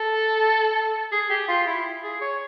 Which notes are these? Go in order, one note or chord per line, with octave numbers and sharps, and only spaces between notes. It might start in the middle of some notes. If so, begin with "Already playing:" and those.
Already playing: A4
G#4
G4
F4
E4
G#4
C#5